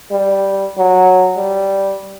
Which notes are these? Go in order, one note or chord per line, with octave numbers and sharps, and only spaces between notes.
G3
F#3
G3